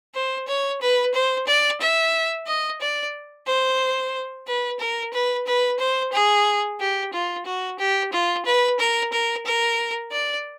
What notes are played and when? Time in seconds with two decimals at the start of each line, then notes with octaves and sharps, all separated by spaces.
0.14 C5
0.48 C#5
0.81 B4
1.14 C5
1.47 D5
1.81 E5
2.47 D#5
2.81 D5
3.47 C5
4.47 B4
4.80 A#4
5.13 B4
5.47 B4
5.79 C5
6.13 G#4
6.80 G4
7.13 F4
7.46 F#4
7.79 G4
8.13 F4
8.45 B4
8.79 A#4
9.12 A#4
9.46 A#4
10.12 D5